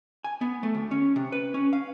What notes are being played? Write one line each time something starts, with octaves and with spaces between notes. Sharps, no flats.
G#5
B3
A3
D2
C#4
C3
B4
C#4
F5